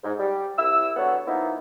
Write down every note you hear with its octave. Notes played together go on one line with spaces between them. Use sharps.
G#2
G3
C2 E4 E6
D3 F#3 B3 C#5 F#5
F3 A#3 B3 D#4 E4